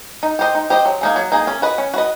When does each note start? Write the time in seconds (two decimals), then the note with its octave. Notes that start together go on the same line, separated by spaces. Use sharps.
0.23 D#4
0.39 G4 C5 D#5
0.55 D#4
0.70 G4 C5 D#5
0.86 F#3
1.01 A#3 D#4 G#4
1.16 F#3
1.32 A#3 D#4 G#4
1.47 C#4
1.62 F#4 B4 D#5
1.78 C#4
1.94 F#4 B4 D#5